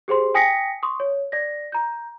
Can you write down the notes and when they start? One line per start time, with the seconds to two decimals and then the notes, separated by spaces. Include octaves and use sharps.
0.08 G4 G#4 C5 C6
0.34 G5 G#5 D#6 A#6 B6 C#7
0.83 C6 C#6 D#6
1.00 C#5
1.32 D5 A#6
1.72 A#5 G6